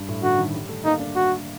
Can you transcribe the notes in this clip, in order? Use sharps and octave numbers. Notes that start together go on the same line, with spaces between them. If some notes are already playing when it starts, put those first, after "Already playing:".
Already playing: G2
A2
D3 F#4
D#3
G3
A3
A#3 D#4
D4
F#4